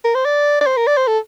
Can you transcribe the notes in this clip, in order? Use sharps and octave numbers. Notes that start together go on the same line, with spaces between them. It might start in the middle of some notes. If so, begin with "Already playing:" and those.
A#4
C5
D5
D5
C5
A#4
D5
C5
A4